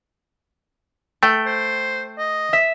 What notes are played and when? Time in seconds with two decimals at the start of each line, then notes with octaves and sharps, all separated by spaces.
1.23 A3 G5
1.46 C5
2.18 D#5
2.53 E5